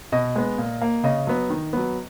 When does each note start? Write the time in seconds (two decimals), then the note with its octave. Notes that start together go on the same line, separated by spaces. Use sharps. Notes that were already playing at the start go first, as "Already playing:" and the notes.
0.12 B2 D#5
0.36 G#3 B3
0.58 A#2
0.82 A#3
1.04 C#3 D#5
1.27 F#3 B3
1.50 D#3
1.73 F#3 B3